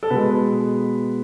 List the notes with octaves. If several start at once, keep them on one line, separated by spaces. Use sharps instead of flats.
A4
B2 G#3 B4